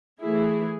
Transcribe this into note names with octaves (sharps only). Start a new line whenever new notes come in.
E3 A3 E4 G#4